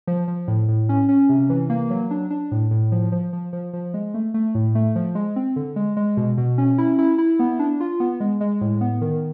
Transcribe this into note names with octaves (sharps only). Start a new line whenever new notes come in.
F3
F3
A2
A2
C#4
C#4
C3
E3
A#3
F#3
D4
D4
A2
A2
F3
F3
F3
F3
F3
G#3
A3
A3
A2
A3
F3
G#3
C4
D3
G#3
G#3
B2
B2
C#4
E4
E4
E4
B3
D4
F4
B3
G#3
G#3
A2
B3
D#3